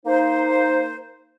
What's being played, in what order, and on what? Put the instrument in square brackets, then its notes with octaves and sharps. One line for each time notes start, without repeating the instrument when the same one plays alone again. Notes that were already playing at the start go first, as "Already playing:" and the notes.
[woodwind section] A#3 D#4 C5